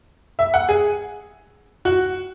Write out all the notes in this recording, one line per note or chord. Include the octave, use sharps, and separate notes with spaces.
E5
F#5
G#4
F#4